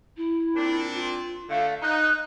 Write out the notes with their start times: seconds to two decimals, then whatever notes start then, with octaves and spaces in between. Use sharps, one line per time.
0.17 E4
0.55 A#2 C4 D4
0.93 F4
1.49 D3 A3 F5
1.82 D#4 F#6